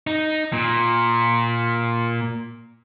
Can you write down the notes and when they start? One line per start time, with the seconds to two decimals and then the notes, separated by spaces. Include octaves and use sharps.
0.07 D#4
0.53 A#2